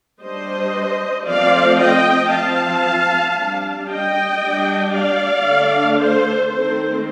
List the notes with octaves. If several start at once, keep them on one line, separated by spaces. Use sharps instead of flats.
G3 D4 C5 D#5
F3 A3 C4 D5 F5
D#5 G5
F3 C4 F5 A5
G3 D4
D#5 G5
G3 D4
D5 F5
D3 A3 D4
A4 C5
D#3 A3 C4 A4 C5